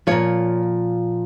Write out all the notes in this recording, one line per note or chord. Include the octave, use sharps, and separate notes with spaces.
A#2 F3 C#5